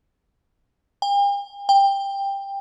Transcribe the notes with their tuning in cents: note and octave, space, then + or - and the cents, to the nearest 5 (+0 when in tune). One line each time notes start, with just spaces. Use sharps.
G5 +45
G5 +15